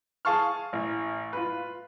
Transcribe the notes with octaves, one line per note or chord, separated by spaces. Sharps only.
G#4 F5 A5 C#6 F6
A1
F4 B4